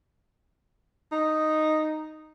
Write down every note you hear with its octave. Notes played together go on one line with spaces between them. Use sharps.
D#4